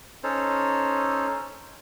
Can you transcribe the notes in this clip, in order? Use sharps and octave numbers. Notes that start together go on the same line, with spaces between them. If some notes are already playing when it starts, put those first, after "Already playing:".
C#4 D#4 A4 C5 C#5